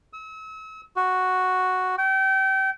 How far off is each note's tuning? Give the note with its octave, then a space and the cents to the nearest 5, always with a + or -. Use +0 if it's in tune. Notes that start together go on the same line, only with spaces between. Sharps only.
E6 -40
F#4 +0
G5 -30